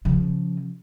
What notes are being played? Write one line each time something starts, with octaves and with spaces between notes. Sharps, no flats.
C#3 F3